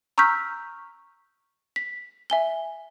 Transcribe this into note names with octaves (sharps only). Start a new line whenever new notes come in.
A#5 C#6 E6 F6 G6 B6
B6
E5 G#5 G7